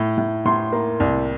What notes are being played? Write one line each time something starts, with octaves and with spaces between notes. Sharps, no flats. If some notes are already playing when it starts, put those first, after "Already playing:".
Already playing: A2
A2
A2 C6
A#3
C2